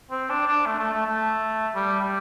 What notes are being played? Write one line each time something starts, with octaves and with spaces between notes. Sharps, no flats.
C4
D4
D4
A3
A3
A3
A3
G3
G3